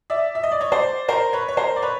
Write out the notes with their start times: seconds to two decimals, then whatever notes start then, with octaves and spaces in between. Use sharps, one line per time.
0.10 D5 E5
0.35 E5
0.43 D#5
0.52 D5
0.60 C#5 D#5
0.72 C5 D5
1.08 A#4 C5
1.33 B4 C#5
1.48 C#5
1.57 A#4 C5
1.76 D5
1.82 B4 C#5